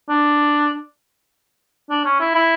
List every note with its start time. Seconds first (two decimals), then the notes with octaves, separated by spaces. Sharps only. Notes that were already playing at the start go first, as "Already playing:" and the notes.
0.09 D4
1.91 D4
2.05 C#4
2.20 E4
2.35 E4